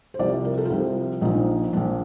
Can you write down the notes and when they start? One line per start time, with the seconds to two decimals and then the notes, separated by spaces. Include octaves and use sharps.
0.14 C5
0.19 C2 C3 F3 D5
0.45 A#4
0.58 A4
0.65 F4
0.70 C2 C3 F3 G4
1.21 A#1 A#2 F3 D#4
1.73 A#1 A#2 F3 D4